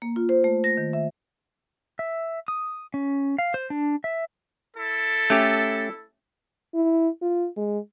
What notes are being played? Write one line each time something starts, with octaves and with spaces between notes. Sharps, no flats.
A#3
F4
C5
A3
A#6
D#3
E5
E5
D#6
C#4
F5
C5
D4
E5
E4 A4
A3 C#4 G4
E4
F4
G#3